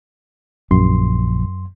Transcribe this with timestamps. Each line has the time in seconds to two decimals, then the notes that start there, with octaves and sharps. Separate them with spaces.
0.71 A#1 F#2 C6